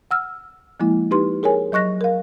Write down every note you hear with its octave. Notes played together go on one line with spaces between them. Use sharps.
F#5 E6 F6
F3 G#3 A#3 E4
D#4 G4 B4 C6
G#4 A#4 C#5 G#5
F#3 D#5 C#6 F#6 A#6
A#4 F5